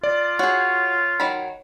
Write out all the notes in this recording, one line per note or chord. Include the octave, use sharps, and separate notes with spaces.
F4 D5
F#4 G#4 C#5
D#3 F#3 B5